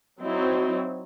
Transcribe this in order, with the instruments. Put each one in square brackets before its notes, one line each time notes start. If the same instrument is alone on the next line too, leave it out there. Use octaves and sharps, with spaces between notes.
[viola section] F#3 C4 D#4 E4